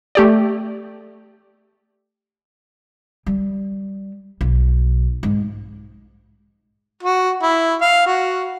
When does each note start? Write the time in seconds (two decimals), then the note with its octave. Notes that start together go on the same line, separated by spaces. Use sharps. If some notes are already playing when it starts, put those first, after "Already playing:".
0.15 A3 G4 D5
3.26 G3
4.41 B1
5.23 G#2
7.03 F#4
7.42 E4
7.81 F5
8.06 F#4